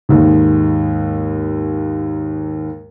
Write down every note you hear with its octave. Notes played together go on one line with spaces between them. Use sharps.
D#2 G#2